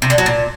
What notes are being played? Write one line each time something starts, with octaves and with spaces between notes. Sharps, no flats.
C3
D3
F#3
A#2